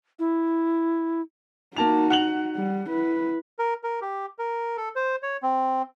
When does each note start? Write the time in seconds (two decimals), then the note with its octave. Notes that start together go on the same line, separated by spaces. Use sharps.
0.19 E4
1.77 A#3 D#4 F#4 A5 F7
2.10 F#5 F7 F#7
2.56 G3
2.89 E4 B4
3.59 A#4
3.83 A#4
4.02 G4
4.39 A#4
4.77 A4
4.96 C5
5.23 C#5
5.43 C4